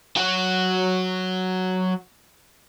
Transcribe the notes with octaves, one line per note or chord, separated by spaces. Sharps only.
F#3 F#4